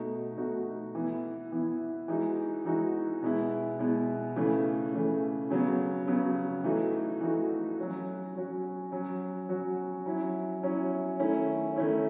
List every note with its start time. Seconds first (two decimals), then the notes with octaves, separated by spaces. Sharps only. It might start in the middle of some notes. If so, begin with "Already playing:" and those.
Already playing: B2 A3 D#4 F#4
0.37 B2 A3 D#4 F#4
0.95 E3 B3 E4
1.52 E3 B3 E4
2.08 E3 G#3 D#4 F#4
2.65 E3 G#3 D#4 F#4
3.22 B2 G#3 B3 E4
3.79 B2 G#3 B3 E4
4.36 C#3 E3 A3
4.93 C#3 E3 A3
5.50 C#3 F#3 B3
6.07 C#3 F#3 B3
6.64 E3 A3 D#4 F#4
7.21 E3 A3 D#4 F#4
7.78 F#3 C#4 F#4
8.35 F#3 C#4 F#4
8.92 F#3 C#4 F#4
9.49 F#3 C#4 F#4
10.06 F#3 C#4 E4
10.63 F#3 C#4 E4
11.20 D#3 A3 C#4 E4
11.76 D#3 A3 C#4 E4